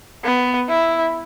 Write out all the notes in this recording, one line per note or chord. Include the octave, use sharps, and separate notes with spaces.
B3
E4